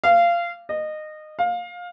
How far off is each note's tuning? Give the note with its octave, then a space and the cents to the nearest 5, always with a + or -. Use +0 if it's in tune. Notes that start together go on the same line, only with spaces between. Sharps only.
F5 -20
D#5 -20
F5 +20